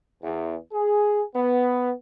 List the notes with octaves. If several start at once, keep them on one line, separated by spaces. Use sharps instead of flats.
E2
G#4
B3